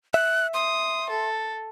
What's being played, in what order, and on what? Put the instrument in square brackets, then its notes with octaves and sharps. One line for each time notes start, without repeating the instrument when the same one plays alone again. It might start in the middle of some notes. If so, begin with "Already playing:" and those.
[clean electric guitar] E5 [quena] F#6
[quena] C6 [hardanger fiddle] D#6
[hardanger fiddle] A4